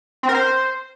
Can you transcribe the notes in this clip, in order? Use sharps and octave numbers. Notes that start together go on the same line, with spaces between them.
C4
A#4
C5